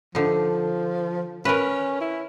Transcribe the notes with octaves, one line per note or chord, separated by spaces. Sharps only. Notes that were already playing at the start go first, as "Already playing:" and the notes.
D3 F3 D#4
C#4 A#4 B4
E4